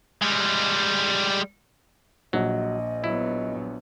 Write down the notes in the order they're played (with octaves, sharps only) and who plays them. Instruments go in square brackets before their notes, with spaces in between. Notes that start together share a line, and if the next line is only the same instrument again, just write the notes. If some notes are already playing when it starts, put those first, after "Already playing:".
[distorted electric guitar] G3 G#3
[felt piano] A#1 [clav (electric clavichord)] F#3 [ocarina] D#5
[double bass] F#3 B3 [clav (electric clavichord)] E4